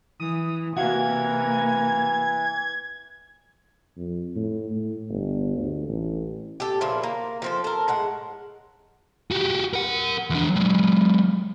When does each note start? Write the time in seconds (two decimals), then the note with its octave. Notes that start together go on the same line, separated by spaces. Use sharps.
0.20 E3 D#6
0.76 C3 E3 A#3 F#4 F5 G#6
3.97 F2
4.36 A2
4.71 A2
5.09 G1
5.57 D2
5.88 A1
6.60 G4 A4
6.81 A#2 C#3 F3 E4
7.03 A#3
7.42 F3 C4 A4
7.64 A4 A#4
7.88 A2 G#3 F#5
9.31 F#4 G4
9.73 A#4 F#5
10.30 E2 D4
10.50 F#3 G#3